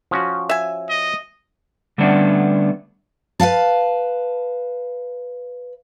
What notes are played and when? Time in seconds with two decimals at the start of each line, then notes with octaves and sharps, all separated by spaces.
0.11 F3 C#4 F#4
0.49 E5 G#5
0.90 D#5
1.98 D3 G3 A3 B3 C#4 D4
3.40 B4 D#5 F5 A5